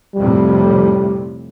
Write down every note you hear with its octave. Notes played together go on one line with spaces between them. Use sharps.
F2 A2 C3 G3